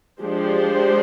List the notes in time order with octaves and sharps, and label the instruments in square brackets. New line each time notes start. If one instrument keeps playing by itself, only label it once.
[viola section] F3 G#3 D4 G4 C5